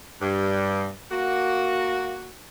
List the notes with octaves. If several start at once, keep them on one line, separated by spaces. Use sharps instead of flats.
G2
A#3 F#4